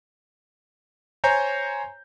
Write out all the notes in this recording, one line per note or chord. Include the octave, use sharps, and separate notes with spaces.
C5 C#5 G#5 A#5 G6